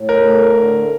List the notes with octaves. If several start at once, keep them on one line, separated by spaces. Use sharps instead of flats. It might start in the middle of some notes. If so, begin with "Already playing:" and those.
Already playing: A2
A#4
A3
D3